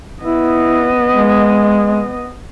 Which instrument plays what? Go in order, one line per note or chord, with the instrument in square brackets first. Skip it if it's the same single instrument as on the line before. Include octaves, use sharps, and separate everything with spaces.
[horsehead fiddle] B3 D#5 [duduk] E4
[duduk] G#3